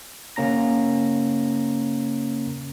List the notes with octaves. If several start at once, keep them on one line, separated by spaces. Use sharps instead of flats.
C#3 A#3 C#4 A#5 A#6